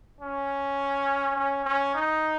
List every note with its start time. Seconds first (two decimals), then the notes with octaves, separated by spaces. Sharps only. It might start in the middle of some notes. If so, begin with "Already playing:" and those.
0.21 C#4
1.37 C#4
1.66 C#4
1.95 D#4